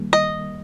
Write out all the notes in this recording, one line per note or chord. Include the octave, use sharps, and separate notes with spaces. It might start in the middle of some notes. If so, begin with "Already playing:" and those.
Already playing: D#3 G3 A#3
D#5